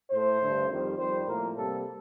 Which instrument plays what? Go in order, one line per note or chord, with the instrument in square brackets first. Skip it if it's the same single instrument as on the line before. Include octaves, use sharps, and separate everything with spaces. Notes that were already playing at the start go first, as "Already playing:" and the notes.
[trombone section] A2 A3 C5
G2 D3 A3
F2 D#3 G3
F2 D#3 G3 C5
A2 F3 A#3 A#4
C3 G3 A#3 A4